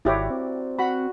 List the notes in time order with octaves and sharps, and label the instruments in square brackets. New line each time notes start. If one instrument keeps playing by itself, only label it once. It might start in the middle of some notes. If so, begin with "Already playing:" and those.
[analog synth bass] G#1 [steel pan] E4 G4 C#5 [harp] F#4 A#4 D5
[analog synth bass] C4
[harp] F#4 F#5 [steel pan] B5